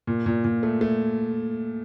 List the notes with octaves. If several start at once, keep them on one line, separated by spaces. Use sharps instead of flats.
A#2
A#2
A#2
A3
A3